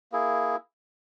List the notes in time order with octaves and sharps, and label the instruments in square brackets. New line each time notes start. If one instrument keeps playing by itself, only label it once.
[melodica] A#3 E4 G#4